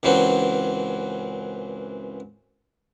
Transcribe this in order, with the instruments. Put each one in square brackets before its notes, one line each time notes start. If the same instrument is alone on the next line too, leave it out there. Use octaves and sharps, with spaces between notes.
[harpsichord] C#2 F#2 E3 F#3 C4